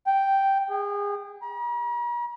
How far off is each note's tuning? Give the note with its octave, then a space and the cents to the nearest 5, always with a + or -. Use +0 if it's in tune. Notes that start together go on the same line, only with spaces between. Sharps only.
G5 -5
G#4 -30
A#5 +45